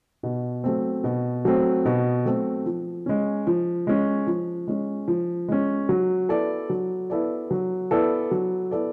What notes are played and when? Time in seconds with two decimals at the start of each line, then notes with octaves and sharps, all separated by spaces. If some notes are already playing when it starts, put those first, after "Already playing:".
0.23 B2
0.64 F#3 A3 C4
1.04 B2
1.45 F#3 A3 C4
1.85 B2
2.26 F#3 A3 C4
2.66 F3
3.06 G#3 C#4
3.47 F3
3.87 G#3 C#4
4.27 F3
4.68 G#3 C#4
5.08 F3
5.48 G#3 C#4
5.89 F#3
6.29 B3 E4 A4 D5
6.70 F#3
7.10 B3 E4 A4 D5
7.51 F#3
7.91 B3 E4 A4 D5
8.31 F#3
8.71 B3 E4 A4 D5